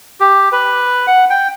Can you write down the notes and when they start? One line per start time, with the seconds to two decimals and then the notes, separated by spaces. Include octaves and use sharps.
0.20 G4
0.52 B4
1.07 F#5
1.30 G5